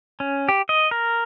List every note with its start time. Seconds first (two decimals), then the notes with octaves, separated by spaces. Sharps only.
0.20 C#4
0.49 G4
0.69 D#5
0.91 A#4